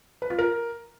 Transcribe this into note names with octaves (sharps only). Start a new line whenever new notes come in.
B4
F4
A#4